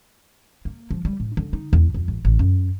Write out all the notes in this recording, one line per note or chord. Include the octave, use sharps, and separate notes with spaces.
A#3
F3
G3
A2
D3
D#4
E2
F2
A1
A1
F#2